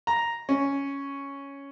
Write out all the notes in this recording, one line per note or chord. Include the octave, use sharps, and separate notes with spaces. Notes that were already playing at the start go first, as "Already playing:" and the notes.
A#5
C#4